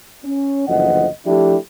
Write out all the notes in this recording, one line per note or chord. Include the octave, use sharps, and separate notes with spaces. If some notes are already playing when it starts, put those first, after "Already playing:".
C#4
F#1 D2 E3 F3 D#5 F#5
F3 A3 D4 E4 G4